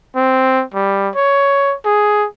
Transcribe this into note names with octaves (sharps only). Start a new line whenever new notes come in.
C4
G3
C#5
G#4